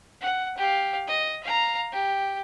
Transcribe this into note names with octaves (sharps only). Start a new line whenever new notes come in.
F#5
G4 F5
D#5
F5 A#5
G4